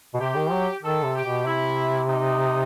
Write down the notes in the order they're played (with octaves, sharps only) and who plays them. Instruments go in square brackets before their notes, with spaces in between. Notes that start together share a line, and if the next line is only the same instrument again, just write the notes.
[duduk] B2
[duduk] C3 [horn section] G4
[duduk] D#3
F#3
[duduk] D#3 [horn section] A4
[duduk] C3
[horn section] G4
[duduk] B2
[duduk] C3 [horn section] E4
[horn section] D#4